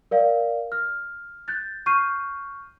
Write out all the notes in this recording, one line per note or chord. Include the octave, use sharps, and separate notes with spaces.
A#4 D5 F5
F6
F#6 G6 A6
C#6 F6 G6 C7 D#7